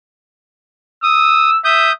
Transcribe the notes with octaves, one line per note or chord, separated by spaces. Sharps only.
D#6 E6
E5 D#6 G6